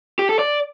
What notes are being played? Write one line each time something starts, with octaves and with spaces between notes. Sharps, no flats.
G4
A4
D5